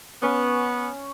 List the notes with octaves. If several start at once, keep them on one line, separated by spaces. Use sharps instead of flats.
B3 C#4